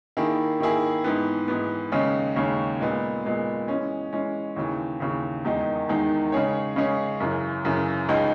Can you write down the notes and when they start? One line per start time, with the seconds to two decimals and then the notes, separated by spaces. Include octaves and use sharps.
0.17 D#3 A#3 E4 G#4
0.60 D#3 A#3 E4 G#4
1.04 G#2 E3 B3
1.48 G#2 E3 B3
1.92 D#2 C#3 G#3 C#4
2.36 D#2 C#3 G#3 C#4
2.80 A#2 G#3 B3
3.25 A#2 G#3 B3
3.68 E3 G#3 C#4
4.13 E3 G#3 C#4
4.56 D#2 C#3 E3
5.00 D#2 C#3 E3
5.45 E2 D#3 G#3 D#4
5.89 E2 D#3 G#3 D#4
6.32 C#3 G#3 C#4 G#4 C#5
6.76 C#3 G#3 C#4 G#4 C#5
7.20 F#2 C#3 E3
7.65 F#2 C#3 E3
8.09 C#2 C#3 G#3 D#4